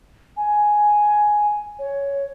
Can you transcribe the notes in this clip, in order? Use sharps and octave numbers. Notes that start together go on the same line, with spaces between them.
G#5
C#5